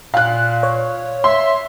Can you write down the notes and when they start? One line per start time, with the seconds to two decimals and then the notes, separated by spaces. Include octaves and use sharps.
0.14 A#2 F5 F#6
0.63 C#5
1.24 E5 C6